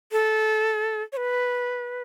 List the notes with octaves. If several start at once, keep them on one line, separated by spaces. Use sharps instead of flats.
A4
C#5
B4